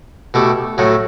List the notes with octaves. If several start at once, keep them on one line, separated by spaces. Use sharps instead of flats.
B2 A3 E4 G4
A2 F#3 A3